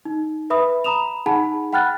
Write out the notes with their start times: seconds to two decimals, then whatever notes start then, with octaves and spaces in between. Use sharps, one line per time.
0.05 D#4
0.50 B4 E5 B5 D#6
0.84 A#5 B5 D#6 E7 F7
1.26 D#4 G#4 F#5 G#5 A5 B5
1.73 F#5 G5 B5 F6 F#6 A6